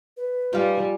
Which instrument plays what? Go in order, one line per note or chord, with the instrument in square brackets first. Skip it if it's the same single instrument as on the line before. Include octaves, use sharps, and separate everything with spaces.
[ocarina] B4
[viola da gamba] G3 [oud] D#4 F5 [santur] F4 G#5